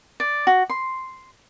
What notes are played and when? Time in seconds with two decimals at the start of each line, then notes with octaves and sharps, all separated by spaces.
0.20 D5
0.47 F#4
0.70 C6